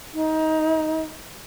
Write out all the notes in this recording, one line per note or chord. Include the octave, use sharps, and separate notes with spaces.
D#4